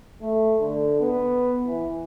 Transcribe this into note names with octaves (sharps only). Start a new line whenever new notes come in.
A3
D3
B3
E3